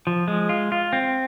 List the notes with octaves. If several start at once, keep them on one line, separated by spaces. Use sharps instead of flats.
F3
G#3
F4
F4
C4